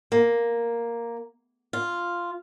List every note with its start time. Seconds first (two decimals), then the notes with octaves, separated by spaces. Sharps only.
0.12 A#3
1.73 F4